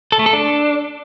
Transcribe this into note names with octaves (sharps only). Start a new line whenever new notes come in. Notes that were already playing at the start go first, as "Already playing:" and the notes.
A4
A3
A4
D4